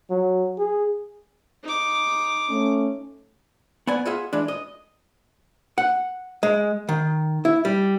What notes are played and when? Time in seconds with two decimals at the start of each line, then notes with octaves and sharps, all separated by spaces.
0.10 F#3
0.58 G#4
1.63 D#4 D6
2.50 A3 C#4
3.87 B3 D5 F#5 G#5
4.05 F4 G#4 E5 F#5
4.33 E3 G#3 D4
4.48 D#5
5.78 F#5
6.43 G#3
6.89 D#3
7.45 E4
7.65 G3